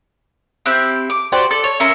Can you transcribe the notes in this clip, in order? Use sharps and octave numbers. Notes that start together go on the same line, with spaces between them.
C4 E4 G4 F#6
D6
F#4 G4 C5 D5
A4 D5
C#5
C#4 A#4 E5 C6